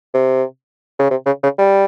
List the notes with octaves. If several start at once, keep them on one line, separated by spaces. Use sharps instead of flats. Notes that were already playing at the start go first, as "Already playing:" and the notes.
C3
C#3
C3
C#3
C#3
G3